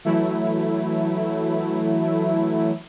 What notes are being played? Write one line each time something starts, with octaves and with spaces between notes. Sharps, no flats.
E3 F#3 A3 E4